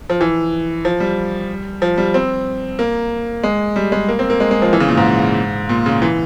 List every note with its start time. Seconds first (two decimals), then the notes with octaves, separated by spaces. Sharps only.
0.10 F3
0.21 E3
0.85 F3
1.00 G3
1.82 F3
1.98 G3
2.14 C4
2.79 A#3
3.43 G#3
3.76 G3
3.92 G#3
4.09 A#3
4.19 C4
4.30 A#3
4.40 G#3
4.51 G#3
4.62 F3
4.73 E3
4.80 C#3
4.88 A#2
4.97 G#2
5.69 A#2
5.86 C#3
6.02 E3